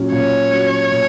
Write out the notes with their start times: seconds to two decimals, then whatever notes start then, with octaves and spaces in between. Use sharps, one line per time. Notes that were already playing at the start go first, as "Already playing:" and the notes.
Already playing: A#2 F#3 C#4
0.12 A#2 C#5
0.52 F#3 C#4
0.92 A#2